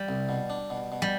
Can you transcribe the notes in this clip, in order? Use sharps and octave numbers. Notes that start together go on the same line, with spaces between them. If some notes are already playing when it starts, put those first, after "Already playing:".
Already playing: G3
C2
B2
D4
B2
B2
G3